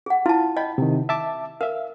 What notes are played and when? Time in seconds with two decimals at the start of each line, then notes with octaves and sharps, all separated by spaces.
0.06 G#4 F#5
0.26 E4 F4 A5
0.57 D#5 G5 B5
0.78 C3 D#3
1.09 E5 A5 D6
1.61 A#4 E5 F5